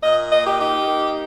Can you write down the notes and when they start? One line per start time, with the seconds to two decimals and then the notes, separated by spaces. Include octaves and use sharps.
0.03 A#2 D#5
0.31 A#3 D#5
0.46 G4
0.60 D#4 G4
0.87 A#3